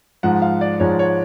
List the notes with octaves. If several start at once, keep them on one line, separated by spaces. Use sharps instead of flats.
G#2 F3 G#3 F#5
F5
D5
G#2 F3 G#3 C#5
C#5